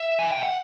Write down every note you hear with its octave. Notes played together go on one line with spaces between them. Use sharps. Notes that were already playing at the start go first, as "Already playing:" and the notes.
Already playing: E5
G#5
G5
F#5